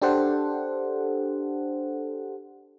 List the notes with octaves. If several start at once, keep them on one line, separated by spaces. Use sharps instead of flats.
D4 G4 A4 C5 F#5